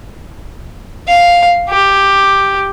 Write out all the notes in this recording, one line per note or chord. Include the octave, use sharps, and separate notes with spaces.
F5
G4